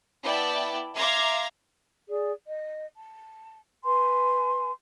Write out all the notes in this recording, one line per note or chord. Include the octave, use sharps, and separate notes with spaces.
B3 E4 D5 G5 A5
E5 F5 A#5 C6 D6 G#6
G#4 D5
D#5
A5
B4 G#5 C6